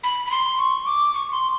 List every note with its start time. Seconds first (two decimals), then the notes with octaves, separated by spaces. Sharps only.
0.04 B5
0.26 B5
0.31 C6
0.58 C#6
0.86 D6
1.14 C#6
1.32 C6